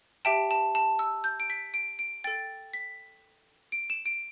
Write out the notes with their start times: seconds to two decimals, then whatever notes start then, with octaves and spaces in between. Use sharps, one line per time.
0.25 G4 E5 G5 A5
0.51 A5
0.75 A5
0.99 E6
1.24 G6
1.40 D7
1.50 B6
1.74 D7
1.99 D7
2.24 A4 G5 A6
2.73 B6
3.72 D7
3.90 E7
4.06 D7